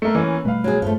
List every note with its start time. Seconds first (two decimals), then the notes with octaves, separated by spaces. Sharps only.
0.02 A3 A#3
0.15 E3 A#3 C#4
0.45 B2 G3 A3 B4 F5
0.64 F#3 G#4
0.82 G2 F3 A3